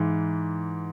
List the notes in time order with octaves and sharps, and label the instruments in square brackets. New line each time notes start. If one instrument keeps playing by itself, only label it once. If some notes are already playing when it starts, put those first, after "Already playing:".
Already playing: [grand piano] G#2 E3